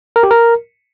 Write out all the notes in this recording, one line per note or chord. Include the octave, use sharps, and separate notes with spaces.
A#4
G4
A#4